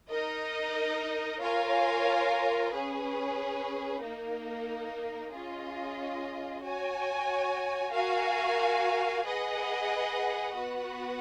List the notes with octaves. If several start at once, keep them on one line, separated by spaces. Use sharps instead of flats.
D#4 A#4 D#5
F4 A#4 C#5 F5 G#5
C#4 G#4 B4
A#3 D#4 A#4
C#4 F4 G#4 D#5
F#4 C#5 G#5
F#4 A#4 F5 G#5
G#4 B4 D#5 F#5
B3 F#4 B4 F#5